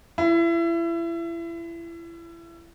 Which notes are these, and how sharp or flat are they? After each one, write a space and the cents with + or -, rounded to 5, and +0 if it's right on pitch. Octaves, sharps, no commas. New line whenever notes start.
E4 +30